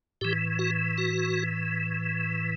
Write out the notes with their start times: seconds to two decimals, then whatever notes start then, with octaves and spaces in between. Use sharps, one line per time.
0.21 A2 E3 G4
0.59 F#4
0.98 F#4